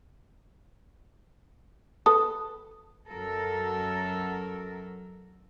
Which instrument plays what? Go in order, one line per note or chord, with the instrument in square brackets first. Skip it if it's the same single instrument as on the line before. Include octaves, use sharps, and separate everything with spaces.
[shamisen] A4 B4 [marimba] D#6
[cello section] F#2 F#3 A4 A#4